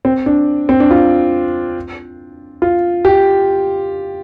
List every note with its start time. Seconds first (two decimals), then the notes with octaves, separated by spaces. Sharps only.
0.05 C4
0.26 D4
0.69 C4
0.80 D4
0.91 F4
2.62 F4
3.05 G4